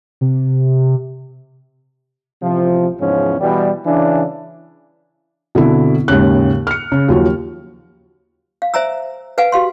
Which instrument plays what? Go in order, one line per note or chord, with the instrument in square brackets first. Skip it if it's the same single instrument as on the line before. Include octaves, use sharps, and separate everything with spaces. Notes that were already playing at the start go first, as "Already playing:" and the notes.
[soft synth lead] C3
[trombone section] A1 C3 F3
E2 G#2 C#3 F3 C#4
B2 E3 G3
C#3 E3 D4
[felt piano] B2 D3 C4 E4
D#2 G#2 C#3 F#6
F6 C#7
C#3
D#2 F3 F#3
[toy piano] F5
C5 E5 G#5 A#5 E6
B4 F5 F#5 G#5
F#4 G4 F5 C6